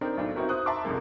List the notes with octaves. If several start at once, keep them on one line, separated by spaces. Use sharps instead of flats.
C4 D4 D#4 A#4
B1 A2 D4
C4 D#4 E4 F#4 A#4 B4
C5 D#6 F#6
E5 A5 A#5 C6 D6 E6
A#1 F2 C3 G#3 A#3